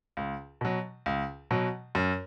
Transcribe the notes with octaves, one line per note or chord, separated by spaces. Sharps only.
C#2
B2 F#3
C#2
B2 F#3
F#2